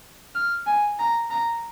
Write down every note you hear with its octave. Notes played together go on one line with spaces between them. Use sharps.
F6
G#5
A#5
A#5